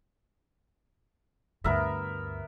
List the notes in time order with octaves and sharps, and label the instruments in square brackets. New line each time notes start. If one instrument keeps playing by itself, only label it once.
[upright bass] D2 G2 [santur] B3 A#4 E5